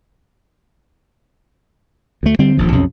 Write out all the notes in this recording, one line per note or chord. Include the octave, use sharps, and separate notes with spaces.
D2 A3
D3 G3 C4
D#1 A#1 F3
B1 F2 C3 C#4